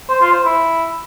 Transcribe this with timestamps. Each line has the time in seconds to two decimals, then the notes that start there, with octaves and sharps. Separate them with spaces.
0.09 C5
0.21 F4
0.32 C5
0.44 E4